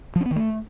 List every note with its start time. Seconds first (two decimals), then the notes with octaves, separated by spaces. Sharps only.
0.16 F3
0.21 C#4
0.26 B3
0.31 D#3
0.36 A3